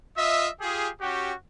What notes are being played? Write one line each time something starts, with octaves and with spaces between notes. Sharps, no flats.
F4 D#5 E5
F4 G4 G#4
C#4 F#4 G4